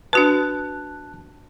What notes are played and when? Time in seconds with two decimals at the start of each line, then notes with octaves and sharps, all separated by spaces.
0.13 D4 F#4 B4 A5 F#6